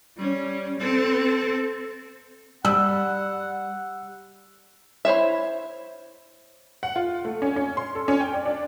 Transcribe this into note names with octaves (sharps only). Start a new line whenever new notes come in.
G3 C#4
C4 A4
G3 F#5 E6
E4 C5 C#5 E5
F#5
F4
A3
C#4
C#4
C6
A4
C#4
G5
D5
D4